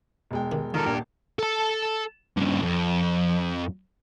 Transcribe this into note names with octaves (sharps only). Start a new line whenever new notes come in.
E1 G#3 G5
G2 D#3
A#2 D#3 A4 A#4
D#1 D4 G4
A4 A5
G2 C#3
F2